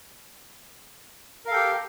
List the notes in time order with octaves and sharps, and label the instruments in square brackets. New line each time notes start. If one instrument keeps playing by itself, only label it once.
[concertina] A#4
F5
A4
G5
G4